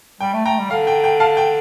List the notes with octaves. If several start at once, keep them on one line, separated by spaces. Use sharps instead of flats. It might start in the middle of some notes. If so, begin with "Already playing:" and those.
G3 G5
A3
A3 G5 A#5
G3
D3 F5
G5
G5
F5 A5
G5